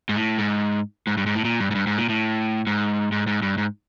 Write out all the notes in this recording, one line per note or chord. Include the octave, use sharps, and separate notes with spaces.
G#2
A2
G#2
G#2
G2
G#2
A2
A#2
G2
G#2
G2
G#2
A#2
A2
G#2
G#2
G#2
G2
G#2